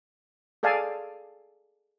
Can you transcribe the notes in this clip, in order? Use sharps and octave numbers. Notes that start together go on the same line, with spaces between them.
G#4 A4 D5 F5 G#5 A5